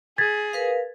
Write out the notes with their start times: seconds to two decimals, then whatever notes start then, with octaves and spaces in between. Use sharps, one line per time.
0.18 G#4 G#6 A6 B6
0.53 A#4 B4 F5